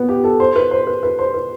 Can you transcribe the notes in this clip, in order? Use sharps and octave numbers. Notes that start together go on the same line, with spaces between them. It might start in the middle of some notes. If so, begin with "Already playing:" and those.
Already playing: B3
G4
A4
C5
B4
C5
B4
B4
C5
B4